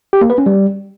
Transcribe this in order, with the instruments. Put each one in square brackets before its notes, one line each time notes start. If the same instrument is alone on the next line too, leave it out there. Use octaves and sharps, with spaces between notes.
[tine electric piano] G4
A#3
B4
C#4
G3